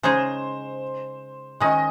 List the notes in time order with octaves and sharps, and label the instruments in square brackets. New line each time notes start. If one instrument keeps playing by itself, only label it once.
[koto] C#3 G#3 D#4 G#4 [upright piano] C5
[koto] D#3 G#3 C#4 [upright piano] D#5